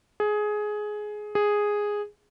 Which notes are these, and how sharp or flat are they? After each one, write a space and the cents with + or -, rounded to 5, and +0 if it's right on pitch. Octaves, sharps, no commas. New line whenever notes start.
G#4 +15
G#4 -5